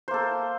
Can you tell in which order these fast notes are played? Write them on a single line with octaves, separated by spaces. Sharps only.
C5 A#3 A4